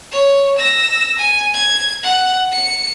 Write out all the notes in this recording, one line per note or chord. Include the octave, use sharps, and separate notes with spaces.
C#5
E6 A#6
G#5
G#6
F#5
C#7